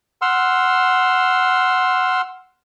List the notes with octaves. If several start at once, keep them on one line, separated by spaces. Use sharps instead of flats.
F#5 C6 E6 F6